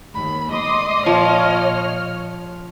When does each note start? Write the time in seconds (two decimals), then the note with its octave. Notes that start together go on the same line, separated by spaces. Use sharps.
0.15 D#2 B5
0.52 D#5 C6 D6 D#6
1.06 A#1 F3 C#5 F6